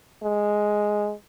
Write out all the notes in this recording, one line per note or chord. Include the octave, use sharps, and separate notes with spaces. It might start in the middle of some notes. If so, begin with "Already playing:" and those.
G#3